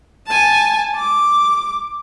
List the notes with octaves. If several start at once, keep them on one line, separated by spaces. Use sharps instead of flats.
G#5 A5
D6